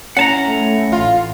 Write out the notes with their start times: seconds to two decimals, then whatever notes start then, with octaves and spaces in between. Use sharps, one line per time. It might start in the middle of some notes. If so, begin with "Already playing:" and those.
0.17 C#4 E4 F#5 A5 A#5
0.46 A3
0.92 A1 F4